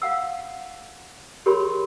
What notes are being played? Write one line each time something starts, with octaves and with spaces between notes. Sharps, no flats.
F5 F#5 E6
G4 G#4 A#4 C#5 B5 C6